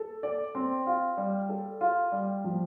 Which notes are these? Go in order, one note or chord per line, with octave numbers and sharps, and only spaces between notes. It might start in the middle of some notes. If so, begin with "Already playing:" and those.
Already playing: A4
D5
C4
F4
G3
A4
F4
G3
F3